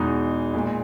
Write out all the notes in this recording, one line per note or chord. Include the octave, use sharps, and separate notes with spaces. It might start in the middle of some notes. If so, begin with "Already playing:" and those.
Already playing: E2 B2 G#3 D#4
A#2 G#3